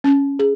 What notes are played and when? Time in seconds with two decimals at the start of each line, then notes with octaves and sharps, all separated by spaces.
0.04 C#4
0.39 G#4